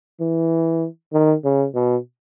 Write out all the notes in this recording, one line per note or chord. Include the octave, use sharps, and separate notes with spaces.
E3
D#3
C#3
B2